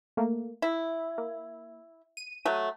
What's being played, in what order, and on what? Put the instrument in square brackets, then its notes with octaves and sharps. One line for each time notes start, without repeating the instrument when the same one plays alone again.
[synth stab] A3 A#3
[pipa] E4 [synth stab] E5
[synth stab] A#3
D#7
[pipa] F#3 A3